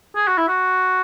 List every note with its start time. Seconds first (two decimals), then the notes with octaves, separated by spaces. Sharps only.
0.16 G#4
0.27 F#4
0.37 E4
0.48 F#4